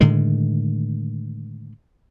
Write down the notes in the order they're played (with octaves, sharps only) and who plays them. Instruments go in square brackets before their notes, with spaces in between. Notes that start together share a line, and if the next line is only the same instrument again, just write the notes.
[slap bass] A2 D3 D#3 G#3